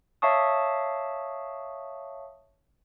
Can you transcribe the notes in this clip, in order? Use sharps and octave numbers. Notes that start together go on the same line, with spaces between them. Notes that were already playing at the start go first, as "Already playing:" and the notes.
C#5 E5 F5 A5 C#6 D#6